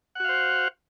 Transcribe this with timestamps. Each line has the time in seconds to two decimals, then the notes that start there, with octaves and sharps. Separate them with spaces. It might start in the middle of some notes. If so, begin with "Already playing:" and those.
0.15 F#5
0.20 F#4
0.24 F5
0.29 C5